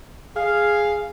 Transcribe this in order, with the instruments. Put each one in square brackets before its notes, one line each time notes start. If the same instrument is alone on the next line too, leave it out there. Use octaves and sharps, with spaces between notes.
[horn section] G#4 F5